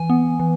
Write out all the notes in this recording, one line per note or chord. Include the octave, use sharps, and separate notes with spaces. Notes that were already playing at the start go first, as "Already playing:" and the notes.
Already playing: E3 G#5
B3
E3